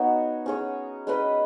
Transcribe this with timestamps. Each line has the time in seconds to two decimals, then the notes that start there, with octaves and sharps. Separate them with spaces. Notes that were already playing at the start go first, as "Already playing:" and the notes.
Already playing: B3 D#4 F#4 C#5
0.46 C#4 G#4 C#5
1.07 G#3 C#4 B4 D#5